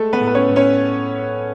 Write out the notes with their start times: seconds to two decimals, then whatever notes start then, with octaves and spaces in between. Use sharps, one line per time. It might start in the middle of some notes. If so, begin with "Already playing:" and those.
Already playing: G#3 A3 A4
0.13 B3 B4
0.21 A2
0.27 B4
0.35 C#4 C#5
0.49 A2
0.56 C#4 C#5